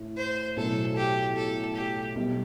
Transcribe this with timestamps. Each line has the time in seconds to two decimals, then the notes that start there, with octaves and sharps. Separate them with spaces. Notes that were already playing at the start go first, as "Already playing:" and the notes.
Already playing: A2
0.17 C5
0.57 B1 A2 F#3 A4
0.96 G4
1.36 A4
1.76 G4
2.16 B1 B2 G3